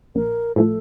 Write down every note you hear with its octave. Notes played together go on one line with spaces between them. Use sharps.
A#1 A#4
A2 F3 A3 A4